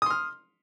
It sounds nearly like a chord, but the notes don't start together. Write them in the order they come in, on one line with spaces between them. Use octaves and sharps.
D#6 C6 F6